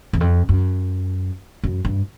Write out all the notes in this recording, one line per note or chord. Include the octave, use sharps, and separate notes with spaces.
E2
F2
F#2
F#2
G2